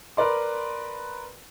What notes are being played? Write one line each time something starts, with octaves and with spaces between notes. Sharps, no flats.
A#4 B4 D5 C6